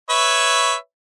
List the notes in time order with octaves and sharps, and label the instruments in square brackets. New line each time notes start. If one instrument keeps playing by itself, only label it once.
[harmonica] B4 C#5 E5